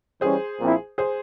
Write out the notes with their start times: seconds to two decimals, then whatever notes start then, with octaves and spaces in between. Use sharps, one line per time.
0.21 E3 G3 C#4 G#4 C5
0.60 A#1 A#2 F3 C4 E4
0.98 G#4 C5